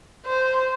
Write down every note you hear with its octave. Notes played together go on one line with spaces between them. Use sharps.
C5